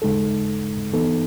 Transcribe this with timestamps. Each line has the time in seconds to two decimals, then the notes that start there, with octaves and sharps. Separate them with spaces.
0.02 D#2 C#3 G#3 D#4 A4
0.93 E3 B3 D#4 A4